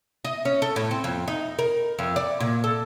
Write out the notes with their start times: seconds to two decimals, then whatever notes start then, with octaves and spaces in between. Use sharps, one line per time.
0.25 D#5
0.45 C#4
0.62 A4
0.76 A2
0.91 C4
1.04 F2
1.28 D#4
1.59 A#4
1.99 F2
2.16 D5
2.40 A#2
2.64 A4